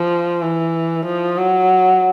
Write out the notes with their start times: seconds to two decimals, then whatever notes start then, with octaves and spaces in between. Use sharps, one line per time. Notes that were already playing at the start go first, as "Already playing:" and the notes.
Already playing: F3
0.42 E3
1.06 F3
1.37 F#3